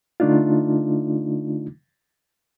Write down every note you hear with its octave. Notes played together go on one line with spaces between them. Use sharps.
D3 A3 D4 D#4 F4